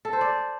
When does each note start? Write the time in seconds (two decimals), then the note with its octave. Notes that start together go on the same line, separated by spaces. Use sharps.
0.05 A4
0.13 C5
0.21 D5